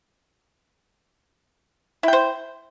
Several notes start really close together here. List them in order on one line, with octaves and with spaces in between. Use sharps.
E4 G5 C5